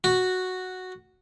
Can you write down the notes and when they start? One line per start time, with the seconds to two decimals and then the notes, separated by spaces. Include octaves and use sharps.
0.04 F#4